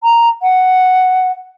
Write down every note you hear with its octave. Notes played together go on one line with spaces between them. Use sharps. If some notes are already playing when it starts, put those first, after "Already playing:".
A#5
F#5